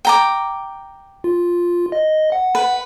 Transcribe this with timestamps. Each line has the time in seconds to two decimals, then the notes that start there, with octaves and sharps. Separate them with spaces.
0.05 G5 A#5 D6
1.24 F4
1.92 D#5
2.32 F#5
2.55 B4